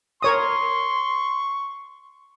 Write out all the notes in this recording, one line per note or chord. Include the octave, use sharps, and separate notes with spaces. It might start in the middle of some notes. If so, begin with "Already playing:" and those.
A#4 C#5 C6 C#6 D#6